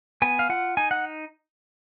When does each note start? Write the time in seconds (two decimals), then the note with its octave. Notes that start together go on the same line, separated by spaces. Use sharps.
0.22 B3 G#5
0.39 F5
0.49 F4 F#5
0.77 D#4 G#5
0.91 F#5